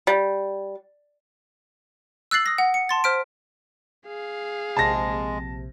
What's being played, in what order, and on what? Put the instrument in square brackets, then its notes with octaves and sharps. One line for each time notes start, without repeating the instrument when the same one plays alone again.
[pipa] G3
[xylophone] E6 F#6 A6 C7 F#7
D#6 A#6
F#5
C#7
A5 C6 A6
C5 F6 B6 D7
[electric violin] G#4 F5
[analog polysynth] A#1 C3 [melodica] G#3 [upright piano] A5 A#6